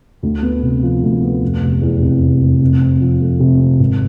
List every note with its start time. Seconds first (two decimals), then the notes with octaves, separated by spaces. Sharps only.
0.23 D2
0.42 B3
0.63 C3
0.83 F3
1.03 D2
1.22 B3
1.42 F1
1.62 F1
1.81 E2
2.01 C3
2.22 F1
2.42 F1
2.62 C3
2.81 C4
3.01 F3
3.21 A3
3.40 C3
3.60 C4
3.80 G#1